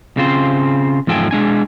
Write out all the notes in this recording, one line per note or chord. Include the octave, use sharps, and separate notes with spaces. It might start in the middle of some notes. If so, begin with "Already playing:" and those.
C#3 C4 F4 C5
E2 G#2 F3 A4 G5 G#5
G#3 D4 G#5